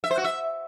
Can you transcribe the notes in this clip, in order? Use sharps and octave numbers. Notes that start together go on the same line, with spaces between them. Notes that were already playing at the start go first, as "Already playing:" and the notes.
E5
C5
F#4
E5